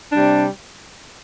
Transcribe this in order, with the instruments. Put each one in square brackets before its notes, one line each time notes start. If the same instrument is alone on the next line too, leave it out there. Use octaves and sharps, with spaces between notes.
[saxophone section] C3 G3 D4